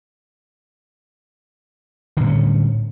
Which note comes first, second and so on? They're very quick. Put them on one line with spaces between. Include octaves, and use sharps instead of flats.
D3 A2 G3 C#4